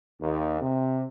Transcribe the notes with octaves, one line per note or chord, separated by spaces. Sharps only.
D#2
C3